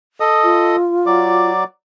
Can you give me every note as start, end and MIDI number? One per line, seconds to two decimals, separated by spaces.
0.20 0.76 69
0.20 0.76 75
0.20 0.76 87
0.44 1.51 65
1.06 1.64 54
1.06 1.64 74
1.06 1.64 86